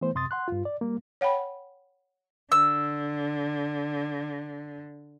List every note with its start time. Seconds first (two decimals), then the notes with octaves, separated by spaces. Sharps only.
0.01 E3 A3 B3 C5
0.15 F#2 C3 C6 D#6 A6
0.31 F#5 C6 F#6
0.48 G2 F4
0.65 D5
0.81 G3 A#3
1.21 C#5 F#5 G5 B5
2.52 D3 E6